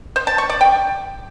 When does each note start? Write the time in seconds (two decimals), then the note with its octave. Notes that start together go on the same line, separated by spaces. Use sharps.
0.16 C5
0.27 A5
0.38 C#6
0.49 D5
0.61 G5